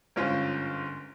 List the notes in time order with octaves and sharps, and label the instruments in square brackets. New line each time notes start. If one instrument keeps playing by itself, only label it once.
[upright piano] G1 G#2 C#4 F4 C5